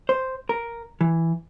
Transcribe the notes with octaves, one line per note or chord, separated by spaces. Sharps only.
C5
A#4
E3